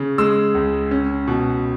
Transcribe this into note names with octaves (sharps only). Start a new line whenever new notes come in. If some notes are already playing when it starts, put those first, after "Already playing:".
Already playing: C#3
G#3 E6
C#2
C#4
B2